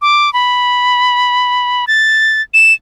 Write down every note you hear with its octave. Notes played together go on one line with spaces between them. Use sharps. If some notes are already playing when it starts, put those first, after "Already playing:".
D6
B5
A6
E7